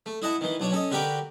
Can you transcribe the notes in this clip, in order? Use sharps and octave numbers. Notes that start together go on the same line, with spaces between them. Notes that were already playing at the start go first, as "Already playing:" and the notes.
A3
E4 D#5 F#5 A5
D#3 E3
B1 D4 C#5
C#4 A4 D#5
D3 F#4 G4 A#4 B4 D6